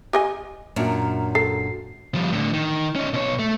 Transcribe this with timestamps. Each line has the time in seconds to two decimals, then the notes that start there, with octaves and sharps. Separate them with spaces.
0.13 G4 D#5 G#5
0.76 F#2 A#2 D4
1.35 A4 C7
2.15 F3 G3
2.32 A2 D3
2.53 D#3
2.95 C#4 D#4
3.14 B2 C#5
3.39 A3